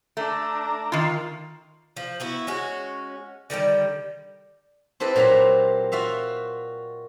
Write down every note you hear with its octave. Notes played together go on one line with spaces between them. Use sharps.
A3 D4 A#5
D#3 F4
F3
B3 E4 F#4
G#3 C#4 F#4
D3 D#3 F3 G3
C4 E4 G4 A4 B4 D#5
A#2 F#3 G4 E5 A#5
F4 F#4 E5 F5